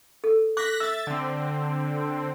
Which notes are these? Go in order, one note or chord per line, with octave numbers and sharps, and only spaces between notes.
A4
D6 F#6 A#6 B6
E5 E6 A6
D3 C4